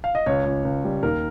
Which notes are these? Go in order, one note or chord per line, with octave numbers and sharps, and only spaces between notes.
F5
D#5
C#2 C#5
C#2
C#2
G3
D#2 A#4